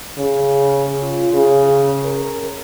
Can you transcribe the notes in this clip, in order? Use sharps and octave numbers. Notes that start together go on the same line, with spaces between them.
C#3
F4
C#3
A#4